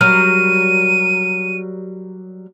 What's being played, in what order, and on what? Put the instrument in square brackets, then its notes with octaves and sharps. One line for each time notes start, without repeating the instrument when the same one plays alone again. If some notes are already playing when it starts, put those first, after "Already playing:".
[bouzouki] F#3 G3 A#4 [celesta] F6 [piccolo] D#7